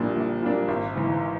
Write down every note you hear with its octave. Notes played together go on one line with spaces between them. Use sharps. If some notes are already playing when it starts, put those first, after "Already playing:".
Already playing: A#1 A#2 G3 A#3 D4
A#1
A#2 G3 A#3 D4
G#1
G#2 E3